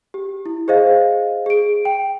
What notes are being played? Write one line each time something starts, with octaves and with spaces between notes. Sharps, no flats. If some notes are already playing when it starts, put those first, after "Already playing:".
G4
E4
G#4 C5 D#5 F5
G#4 D7
G5